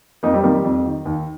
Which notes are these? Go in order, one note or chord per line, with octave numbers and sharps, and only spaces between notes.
F2 A#3 D#4
G3 C4
D#3 F3 A#3
G3
F2
D#3
D#2